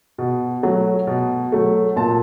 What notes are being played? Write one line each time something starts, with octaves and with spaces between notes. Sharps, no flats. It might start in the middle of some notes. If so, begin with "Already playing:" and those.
B2
F#3 A3
B2
F#3 A3
A#2 A5